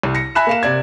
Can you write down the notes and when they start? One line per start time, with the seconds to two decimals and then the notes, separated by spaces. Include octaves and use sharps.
0.03 C2
0.15 A#6 C#7
0.35 E5 G#5 B5 F#6 B6 E7
0.47 A#3 F5 E7
0.63 C3 D5 G#6